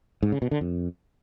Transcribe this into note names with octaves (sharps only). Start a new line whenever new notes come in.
G#2
C#3
B2
D3
F2